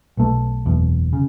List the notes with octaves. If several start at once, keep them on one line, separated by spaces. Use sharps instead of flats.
B1 B2 A3
F#1 E2 B2
C#3